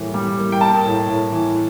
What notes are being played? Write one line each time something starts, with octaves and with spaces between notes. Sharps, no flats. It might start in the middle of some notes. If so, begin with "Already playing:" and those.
Already playing: A2 E3 G3 A#3
G3
A#3
G5
A#3 A5
A2
A2
E3